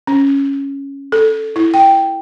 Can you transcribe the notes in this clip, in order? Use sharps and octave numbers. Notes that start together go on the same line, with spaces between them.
C#4
A4
E4
G5